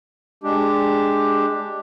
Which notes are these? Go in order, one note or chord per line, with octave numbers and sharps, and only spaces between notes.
G#3 D4 G4